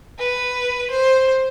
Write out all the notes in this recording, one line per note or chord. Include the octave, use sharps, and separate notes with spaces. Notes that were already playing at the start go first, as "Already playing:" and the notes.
B4
C5